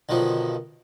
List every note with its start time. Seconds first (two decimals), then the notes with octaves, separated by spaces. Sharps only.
0.09 B1 D3 D#3 F3